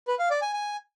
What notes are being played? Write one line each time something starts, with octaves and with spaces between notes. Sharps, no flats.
B4
F5
D5
G#5
G#5